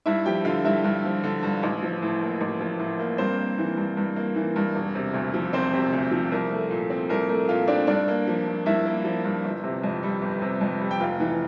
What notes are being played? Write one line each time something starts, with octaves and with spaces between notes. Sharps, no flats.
G2 E4 E5
F3 G4 G5
D3 F4 F5
G2 E4 E5
G2
F3
D3
G2
A1
F3
A2
A#3
A1
F3
A2
A#3
G2 C4 C5
A#3
E3
G2
G2
A#3
E3
G2
E1
C3
D2
F3
E1 C4 C5
C3
D2
F3
C2 A#4
A3
A#2
C4
C2 A#4
A3 A#4
A#2 F4 F5
C4 D4 D5
G2 D4 D5
A#3
F3
G2
G2 E4 E5
A#3
F3
G2
G1
C3
F2
G3
G1
C3
F2
G3
G5
F1 F4 F5
E3